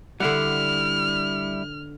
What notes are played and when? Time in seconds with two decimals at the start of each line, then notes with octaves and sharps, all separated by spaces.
0.20 D3 G3 E4 F#5 F6